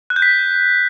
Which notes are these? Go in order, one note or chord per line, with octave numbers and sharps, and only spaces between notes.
F#6
G6
B6